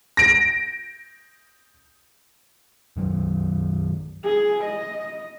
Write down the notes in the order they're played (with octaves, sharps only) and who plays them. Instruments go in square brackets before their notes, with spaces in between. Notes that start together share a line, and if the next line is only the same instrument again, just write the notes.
[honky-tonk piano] A#6 D7
[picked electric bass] F#2 D#3 F#3
[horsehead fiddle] G#4
D#5